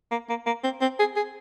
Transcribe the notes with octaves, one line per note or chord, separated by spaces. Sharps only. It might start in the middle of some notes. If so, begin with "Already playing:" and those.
A#3
A#3
A#3
C4
C4
G#4
G#4